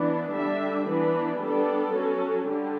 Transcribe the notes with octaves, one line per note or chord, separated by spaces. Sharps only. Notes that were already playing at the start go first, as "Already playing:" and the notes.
Already playing: E3 B3 D4
D3 G3 D4 E5
E3 B3 D4 B4
G3 B3 D4 A4
F#3 C#4
D3 G3 G4